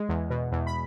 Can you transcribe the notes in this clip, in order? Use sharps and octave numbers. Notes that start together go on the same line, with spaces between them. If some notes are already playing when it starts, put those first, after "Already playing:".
Already playing: G#3
E2
B2
E2
B5